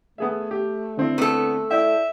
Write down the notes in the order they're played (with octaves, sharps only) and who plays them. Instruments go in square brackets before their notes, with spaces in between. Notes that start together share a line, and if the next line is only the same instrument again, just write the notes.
[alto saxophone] A3 [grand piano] B3 G#4 E5
[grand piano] G4
D3 C4 E4
[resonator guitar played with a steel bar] A3 A4 [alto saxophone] B3
[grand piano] E4 D5 G5 [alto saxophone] E5